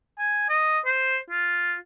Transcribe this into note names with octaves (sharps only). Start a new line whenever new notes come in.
G#5
D#5
C5
F4